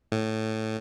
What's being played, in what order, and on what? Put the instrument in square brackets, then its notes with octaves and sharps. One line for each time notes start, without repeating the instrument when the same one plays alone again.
[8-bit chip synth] A2